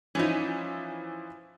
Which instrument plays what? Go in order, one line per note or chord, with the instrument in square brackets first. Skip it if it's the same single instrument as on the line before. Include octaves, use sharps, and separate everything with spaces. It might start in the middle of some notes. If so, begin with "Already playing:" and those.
[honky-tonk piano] E3 F3 E4 [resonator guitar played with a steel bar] C#4 D#4